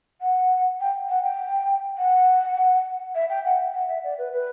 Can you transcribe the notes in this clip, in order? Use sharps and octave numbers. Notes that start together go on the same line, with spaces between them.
F#5
G5
F#5
G5
F#5
E5
G5
F#5
F#5
E5
D5
B4
B4